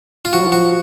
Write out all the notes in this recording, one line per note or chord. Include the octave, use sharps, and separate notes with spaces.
F4
F3 F#4
F#3
F3
F#4